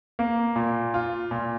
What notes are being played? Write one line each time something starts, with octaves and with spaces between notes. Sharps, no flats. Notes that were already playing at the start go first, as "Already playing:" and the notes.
A#3
A#2
F4
A#2